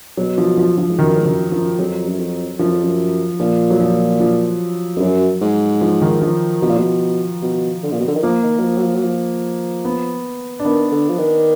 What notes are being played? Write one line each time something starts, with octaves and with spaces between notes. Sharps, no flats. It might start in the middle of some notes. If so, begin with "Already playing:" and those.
B2 F#3
F3
F3
F3
G#2
F#2 D#3
G#2
F#2 D#3
F#2 F3
F2 F#3
F#2
F2
F#2 F3
F2
F#2
A#2 F3
F#3
F3
F3
F2
F#2 F#3
G#2
F3
D#3
F3
B2 F3
A#2
B2
B2
D3
A#2
B2
D3
D#3
F3 A#3
D#3
F#3
F3
F#3
F3
F#3
F3
B3
D4
D#3 B3
D3
F3
D#3